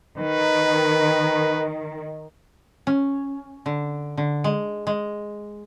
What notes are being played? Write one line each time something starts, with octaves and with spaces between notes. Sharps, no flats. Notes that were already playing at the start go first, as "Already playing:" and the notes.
D#3 B4
C#4
D3
D3
G#3
G#3